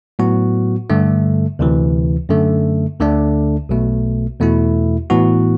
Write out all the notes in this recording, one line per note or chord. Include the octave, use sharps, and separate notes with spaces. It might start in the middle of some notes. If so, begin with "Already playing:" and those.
A2 F#3 B3 F#4
G2 D3 A3
D2 C3 E3
F#2 D3 A3
D2 D3 A3 D4
B1 B2 A3
E2 B2 A3 E4
A2 E3 B3 F#4